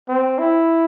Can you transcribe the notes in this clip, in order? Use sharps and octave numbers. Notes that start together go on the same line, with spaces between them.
C4
E4